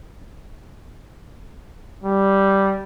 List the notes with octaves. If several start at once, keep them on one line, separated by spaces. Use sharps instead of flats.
G3